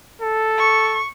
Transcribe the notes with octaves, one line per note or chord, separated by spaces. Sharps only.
A4
C#6